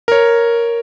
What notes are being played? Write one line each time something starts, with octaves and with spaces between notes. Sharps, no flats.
A#4 C#5